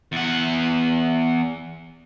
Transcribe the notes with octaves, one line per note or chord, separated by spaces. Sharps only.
E2 F#5